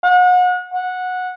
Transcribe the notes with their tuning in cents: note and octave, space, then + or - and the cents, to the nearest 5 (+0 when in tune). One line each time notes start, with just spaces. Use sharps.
F#5 -35
F#5 -15